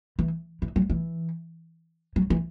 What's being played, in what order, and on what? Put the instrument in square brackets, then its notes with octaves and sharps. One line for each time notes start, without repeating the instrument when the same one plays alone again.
[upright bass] E3
E3
F#3
E3
F#3
E3